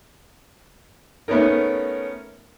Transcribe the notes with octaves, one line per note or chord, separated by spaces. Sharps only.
A3 B3 C#4 D#4 A#4